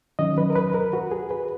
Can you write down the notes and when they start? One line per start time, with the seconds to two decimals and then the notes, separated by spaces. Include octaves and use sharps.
0.19 D#3 F#3 C#4 D#5
0.38 B4
0.50 A#4
0.56 B4
0.74 A#4
0.93 F#4
1.11 G#4
1.31 B4